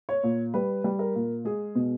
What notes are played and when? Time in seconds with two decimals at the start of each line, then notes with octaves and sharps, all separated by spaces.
0.09 C#5
0.23 A#2
0.54 G3 B4
0.84 G3
0.99 A#4
1.15 A#2
1.45 G#3 G#4
1.75 B2